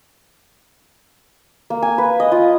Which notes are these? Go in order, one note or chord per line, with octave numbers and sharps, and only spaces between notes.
A#3
G#5
B4
D#5
F4